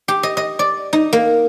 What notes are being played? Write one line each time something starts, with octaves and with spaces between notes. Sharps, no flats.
G4
D#5
D#5
D5
D#4
A#3